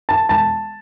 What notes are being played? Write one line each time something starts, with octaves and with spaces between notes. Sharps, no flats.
A5
E1 A5